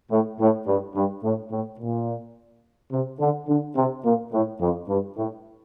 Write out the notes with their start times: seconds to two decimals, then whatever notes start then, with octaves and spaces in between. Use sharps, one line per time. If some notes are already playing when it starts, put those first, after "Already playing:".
0.11 A2
0.40 A2
0.67 G2
0.95 G2
1.24 A2
1.52 A2
1.80 A#2
2.92 C3
3.20 D3
3.48 D3
3.76 C3
4.04 A#2
4.32 A2
4.61 F2
4.89 G2
5.17 A2